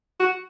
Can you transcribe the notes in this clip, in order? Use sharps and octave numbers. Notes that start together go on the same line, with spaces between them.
F#4